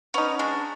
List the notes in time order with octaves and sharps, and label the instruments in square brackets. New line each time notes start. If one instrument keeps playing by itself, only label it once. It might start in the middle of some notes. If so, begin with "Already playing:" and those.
[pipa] B3 D#4 [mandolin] C#4
[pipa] G#3 [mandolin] D4